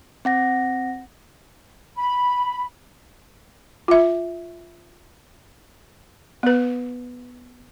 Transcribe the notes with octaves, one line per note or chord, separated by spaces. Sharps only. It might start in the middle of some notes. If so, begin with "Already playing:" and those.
C4 F#5 A#6
B5
F4 E5
B3 B4